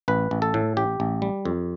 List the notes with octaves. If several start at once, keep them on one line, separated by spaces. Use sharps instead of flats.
A1 B4
A1
A4
A2
A1 G4
A1
G3
F2